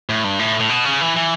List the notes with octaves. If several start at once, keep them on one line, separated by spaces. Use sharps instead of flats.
A2
G2
A2
A2
B2
C#3
E3
E3